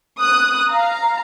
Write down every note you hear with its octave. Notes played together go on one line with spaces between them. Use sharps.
D#6 F#6
F5 A#5